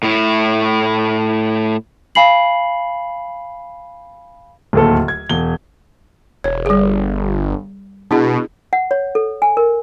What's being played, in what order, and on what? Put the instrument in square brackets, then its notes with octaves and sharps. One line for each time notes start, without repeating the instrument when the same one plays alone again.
[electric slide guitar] A2 E4
[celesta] F5 G#5 B5 C7 F#7
[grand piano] D1 D#2 A4
G#6
E1 G7
[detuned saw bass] E1 [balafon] C#5
[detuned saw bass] G1 [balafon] G3 G#4
[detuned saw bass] B2 [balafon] D4 E4 G#4
[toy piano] F#5
C#5
A4
G#5
A#4